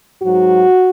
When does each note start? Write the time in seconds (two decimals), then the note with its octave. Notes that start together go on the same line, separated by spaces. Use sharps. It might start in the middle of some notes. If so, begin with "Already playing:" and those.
0.21 G#2 F#3 F#4